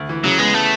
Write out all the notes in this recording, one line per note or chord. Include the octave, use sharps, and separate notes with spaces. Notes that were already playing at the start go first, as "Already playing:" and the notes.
Already playing: D2
E3
C#3 F#3
G#3 B3
A3